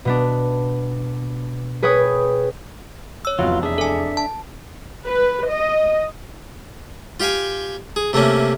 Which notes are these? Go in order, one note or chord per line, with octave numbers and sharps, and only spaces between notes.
B2 B3 D4
G#4 B4 C#5 G5 D#6
C#5 E6
F1 E2 F#3 F4
D4 G#4 E5
A4 G#5
A5
B4
D#5
F4 G4 F5 G5 G#5
G#4
C3 A3 A#3 C#4